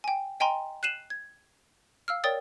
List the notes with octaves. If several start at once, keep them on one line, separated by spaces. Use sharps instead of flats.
G5 G#5
D#5 G5 G#5 A#5 C6
F#6 C7 D#7 E7 F#7
G#6
F5 E6 F6
A#4 C#5 D5 G5 D#6 A6